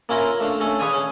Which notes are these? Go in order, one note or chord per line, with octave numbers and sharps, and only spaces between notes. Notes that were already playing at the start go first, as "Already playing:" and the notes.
A#3 C#4 E4 F4 A#4
A3 D4 F5
A3 C#4 A4
G#4 B4 C#5 D5 F5 G#5
C#4